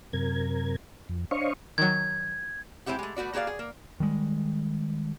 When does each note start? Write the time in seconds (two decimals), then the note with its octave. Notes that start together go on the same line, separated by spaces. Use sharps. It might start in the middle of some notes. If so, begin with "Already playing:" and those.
0.13 F#2 C3 A#4 G#6
1.09 F2
1.31 D4 C5 C#5 D#5 F5 C#6
1.78 D#3 F#3 G#6
2.86 G#3 C4 E4 G4 F#5
2.99 G#3 A3
3.17 A3 B3 F#4 D5
3.34 A#3 F#4 G#4 D5 F5
3.47 G#4
3.59 A#3
4.00 D#3 G3 G#3